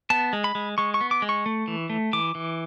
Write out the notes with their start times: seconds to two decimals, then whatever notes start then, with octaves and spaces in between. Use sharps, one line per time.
0.10 B3 A5
0.33 G#3
0.44 B5
0.55 G#3
0.78 G#3 C#6
0.94 C#6
1.01 B3
1.11 D6
1.22 G#3
1.29 C#6
1.46 A3
1.68 E3
1.90 A3
2.13 E3 D6
2.35 E3